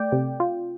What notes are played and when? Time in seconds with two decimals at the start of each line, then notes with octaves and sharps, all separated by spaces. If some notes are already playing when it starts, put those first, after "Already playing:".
Already playing: A3 D5 G5
0.12 C3
0.40 F4